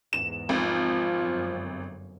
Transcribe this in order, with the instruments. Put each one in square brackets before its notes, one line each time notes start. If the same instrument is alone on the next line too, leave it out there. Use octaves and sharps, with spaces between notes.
[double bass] E2 G#2 [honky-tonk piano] E7
[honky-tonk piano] G#1 [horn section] F3
[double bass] G1 F#2